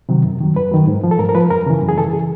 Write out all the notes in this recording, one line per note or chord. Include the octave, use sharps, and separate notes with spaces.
C3 D#3 F#3
F#2
D#3 F#3
F#2 B4
D#3 F#3
G#2
F3
A4
G#2 A#4
A#4
F3 B4
F#2 A#4
C#3 E3
F#2
G#4
C#3 E3 A4
G#4